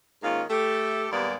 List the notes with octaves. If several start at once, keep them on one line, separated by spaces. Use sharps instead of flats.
G#2 D#3 A#3 C#4 F4
A3 G4 A4
D#2 G#2 G3 A#3 B3 D5